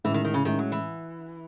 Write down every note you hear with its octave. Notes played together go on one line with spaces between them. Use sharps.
A2 E3 G#3 C#4 E4
D#3
D#3
C#3
A2 D#3 G#3 C#4 E4
F#3
E3